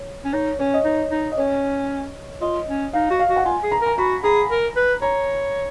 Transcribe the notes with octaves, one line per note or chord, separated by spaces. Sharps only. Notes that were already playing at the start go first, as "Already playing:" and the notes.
Already playing: C#5
C#4
D#4 C#5
C#4 C#5
D#5
D#4 C#5
D#4
D#5
C#4 C#5
F4 D#5
C#4
D#4 F5
F#4
F5
F#4
F#5
F4 G#5
G#4
A#5
A#4
A#5
F#4 B5
G#4 A#5
A#4
B4
C#5 A#5